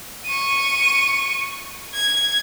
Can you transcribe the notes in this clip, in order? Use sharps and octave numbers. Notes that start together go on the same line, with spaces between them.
C#6 D#7
G#6